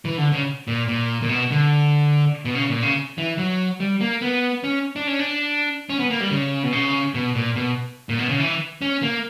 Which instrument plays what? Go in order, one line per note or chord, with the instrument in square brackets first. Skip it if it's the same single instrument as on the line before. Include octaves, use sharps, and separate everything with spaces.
[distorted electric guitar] E3
D3
C#3
A#2
A#2
A#2
B2
D3
B2
C#3
A#2
C#3
E3
F#3
G3
A#3
B3
C#4
D4
C#4
D4
C#4
B3
A#3
G3
C#3
B2
C#3
B2
A#2
B2
A#2
B2
C#3
E3
C#4
A#3